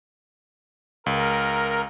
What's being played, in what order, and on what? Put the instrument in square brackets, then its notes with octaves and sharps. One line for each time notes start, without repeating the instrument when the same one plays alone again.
[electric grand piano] C#2 [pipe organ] A#4